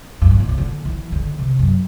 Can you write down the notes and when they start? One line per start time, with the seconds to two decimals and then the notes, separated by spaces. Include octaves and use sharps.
0.22 G2
0.31 A2
0.40 B2
0.49 C3
0.58 D3
0.85 E3
1.12 D3
1.39 C3
1.59 F#2